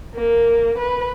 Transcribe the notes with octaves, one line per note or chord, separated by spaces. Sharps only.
A#3
B4